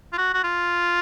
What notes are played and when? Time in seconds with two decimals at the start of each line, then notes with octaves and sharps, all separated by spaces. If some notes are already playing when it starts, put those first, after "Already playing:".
0.13 F4
0.18 F#4
0.34 F#4
0.44 F4